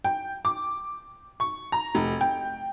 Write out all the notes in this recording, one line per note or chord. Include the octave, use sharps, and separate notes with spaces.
G5
D6
C#6
A#5
F1
G5